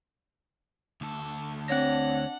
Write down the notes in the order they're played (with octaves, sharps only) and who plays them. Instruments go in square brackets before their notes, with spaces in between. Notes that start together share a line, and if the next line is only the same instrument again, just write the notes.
[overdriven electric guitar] D2 A4
[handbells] C4 A#6 [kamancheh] D4 F#5 [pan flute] C#5